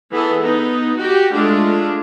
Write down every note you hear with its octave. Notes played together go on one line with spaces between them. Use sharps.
E3 B3 G#4 A4
B3 D#4
F#4 G4 G5
G#3 A3 D4 F4